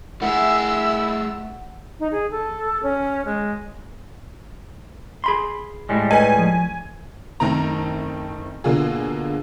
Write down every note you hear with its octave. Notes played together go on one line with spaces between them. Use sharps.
A3 E4 G#4 E5 F#5 E6
D#4
G#4
A4
C#4
G#3
G#4 B5 C6
A2 G3 G#3
A4 B4 D#5 G#5
F3
F#1 D#3 A3 C4 A#5
B2 D3 A#3 F4 G#4